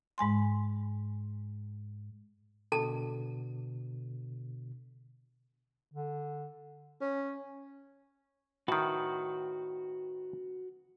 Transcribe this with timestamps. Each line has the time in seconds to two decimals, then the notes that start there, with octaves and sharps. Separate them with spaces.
0.18 G#2 G#3 G#5 C6
2.72 B2 D3 A4 A5
5.93 D3
7.01 C#4
8.68 A2 D#3 F#4 B4